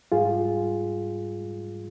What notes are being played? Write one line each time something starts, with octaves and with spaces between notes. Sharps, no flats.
G#2 G3 F4 G#4